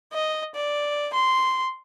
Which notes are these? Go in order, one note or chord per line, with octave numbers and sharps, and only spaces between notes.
D#5
D5
C6